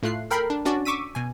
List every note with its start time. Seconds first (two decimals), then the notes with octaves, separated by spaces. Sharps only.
0.03 A2 A3 F4 F#6 C7
0.31 A4 A#4 G5 B5 C7
0.50 D4
0.65 C#4 D4 F#4 D5
0.85 C#6 D6 E6 B6 D#7
1.15 B2 G#5